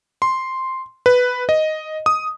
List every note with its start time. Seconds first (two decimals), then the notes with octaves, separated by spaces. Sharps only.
0.22 C6
1.06 B4
1.49 D#5
2.06 D#6